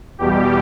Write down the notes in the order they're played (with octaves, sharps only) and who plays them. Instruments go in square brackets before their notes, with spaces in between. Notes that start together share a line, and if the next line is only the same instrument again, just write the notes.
[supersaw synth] E2 B2 G3 G4